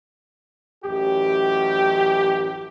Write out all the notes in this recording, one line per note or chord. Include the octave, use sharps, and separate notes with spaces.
A1 F#2 G4